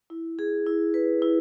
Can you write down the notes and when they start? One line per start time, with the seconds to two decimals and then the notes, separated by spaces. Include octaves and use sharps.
0.10 E4
0.39 G#4
0.66 E4
0.94 B4
1.22 E4